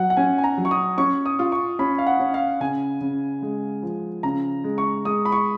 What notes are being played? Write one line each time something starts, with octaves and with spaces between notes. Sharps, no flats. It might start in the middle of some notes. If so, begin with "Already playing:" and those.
Already playing: F#3 F#5
F#5
C#4 G#5
G#5
A#5
F#3
C#6
D#6
C#4 C#6
D#6
F4
C#6
C#4 B5
F5
F#5
C#4
F5
C#3 G#5
C#3
G#3
F3
C#3 A#5
G#3
C#6
G#3 D#6
B5
C#6